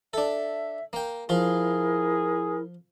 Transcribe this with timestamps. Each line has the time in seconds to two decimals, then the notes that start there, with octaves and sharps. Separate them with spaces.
0.14 D4 A4 E5
0.93 A#3 G5
1.29 F3 E4 F4 G#4 A#4